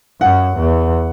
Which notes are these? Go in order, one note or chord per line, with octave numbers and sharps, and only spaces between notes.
F#2 F#5
E2